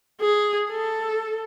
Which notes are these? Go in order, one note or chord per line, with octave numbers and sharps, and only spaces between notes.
G#4
A4